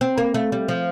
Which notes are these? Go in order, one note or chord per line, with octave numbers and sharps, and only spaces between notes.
C4
A#3
A3
G3
F3